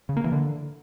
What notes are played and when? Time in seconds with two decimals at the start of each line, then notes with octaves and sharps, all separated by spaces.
0.09 C#3
0.17 A#3
0.24 E3
0.32 D3